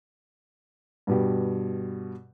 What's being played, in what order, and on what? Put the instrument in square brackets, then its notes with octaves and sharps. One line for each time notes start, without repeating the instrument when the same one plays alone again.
[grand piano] G2 B2 G4